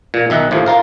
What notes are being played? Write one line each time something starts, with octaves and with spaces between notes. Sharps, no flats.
A#2
B1 D#3 E5 F#5
D#2 A2 F3
F4 A#4 F5